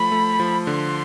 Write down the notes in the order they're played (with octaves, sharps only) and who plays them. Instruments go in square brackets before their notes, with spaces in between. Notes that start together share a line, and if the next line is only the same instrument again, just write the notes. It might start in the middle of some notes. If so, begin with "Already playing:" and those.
Already playing: [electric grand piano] F3 A3 [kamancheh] B5
[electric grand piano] A3
F3
[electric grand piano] D3 [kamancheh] C6